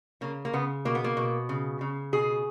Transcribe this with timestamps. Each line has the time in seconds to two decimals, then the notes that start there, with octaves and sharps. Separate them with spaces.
0.21 C#3 A#3
0.45 A#3
0.53 C#3 B3
0.85 B2 A#3
0.95 B3
1.04 A#3
1.17 B2
1.49 C#3
1.81 C#3
2.13 B2 G#4